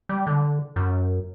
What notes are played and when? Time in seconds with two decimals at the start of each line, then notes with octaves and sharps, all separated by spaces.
0.09 G3
0.27 D3
0.76 F#2